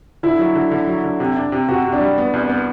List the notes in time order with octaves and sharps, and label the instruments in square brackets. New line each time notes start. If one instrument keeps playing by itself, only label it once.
[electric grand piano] D3 [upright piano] E4
[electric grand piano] F#3
D3
D3
F#3
D3
C3
D4
C3
[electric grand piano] C3 [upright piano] F#4
[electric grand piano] C3
[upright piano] D4
[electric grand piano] G3
B3
C2
B3